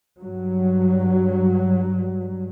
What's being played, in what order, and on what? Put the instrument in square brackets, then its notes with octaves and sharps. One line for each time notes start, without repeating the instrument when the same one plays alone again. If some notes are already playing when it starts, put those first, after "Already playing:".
[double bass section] G2 F#3